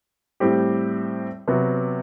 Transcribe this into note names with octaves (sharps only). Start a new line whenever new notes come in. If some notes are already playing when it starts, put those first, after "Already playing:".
A2 G3 C4 G4
C3 F#3 B3